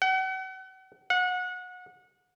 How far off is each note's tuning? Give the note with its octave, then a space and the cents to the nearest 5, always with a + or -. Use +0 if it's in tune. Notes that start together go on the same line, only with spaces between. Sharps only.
F#5 +40
F#5 -25